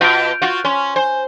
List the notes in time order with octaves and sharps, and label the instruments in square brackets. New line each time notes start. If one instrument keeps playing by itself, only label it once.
[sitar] B2 F4 [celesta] G6 D7
[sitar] F4 F#4
[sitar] C#4 [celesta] C6
[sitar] C5 [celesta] G#5